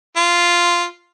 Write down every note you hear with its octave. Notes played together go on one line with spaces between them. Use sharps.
F4